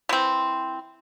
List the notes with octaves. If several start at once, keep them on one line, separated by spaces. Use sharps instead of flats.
E3 C4